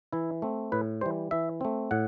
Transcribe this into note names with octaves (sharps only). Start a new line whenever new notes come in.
E3 E4
A3 C4
A2 B4
E3 G3 C5
E3 E5
A3 C4
A2 F#5